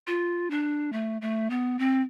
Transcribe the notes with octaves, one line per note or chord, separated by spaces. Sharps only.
F4
D4
A3
A3
B3
C4